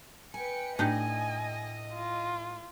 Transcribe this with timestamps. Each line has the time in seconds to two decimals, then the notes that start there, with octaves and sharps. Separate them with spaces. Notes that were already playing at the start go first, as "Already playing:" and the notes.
0.34 B4 G5 G#5 C#7
0.79 A2 D4 D#4 G4 D#5 G#5
1.93 F4